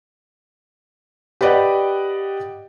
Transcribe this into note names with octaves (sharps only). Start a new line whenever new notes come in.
G4 B4 D5 D#5 F#5 G5